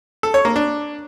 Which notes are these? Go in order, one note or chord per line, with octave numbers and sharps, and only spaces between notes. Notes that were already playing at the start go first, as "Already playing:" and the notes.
A4
C#5
A#3
D4